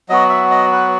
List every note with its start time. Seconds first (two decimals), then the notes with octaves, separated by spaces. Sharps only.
0.09 F#3 B3 F#4 D#5
0.29 E5
0.51 D#5
0.72 B4